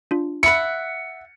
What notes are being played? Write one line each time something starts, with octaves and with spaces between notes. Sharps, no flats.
D4 F4
E5 F#5 B5 C#7 D7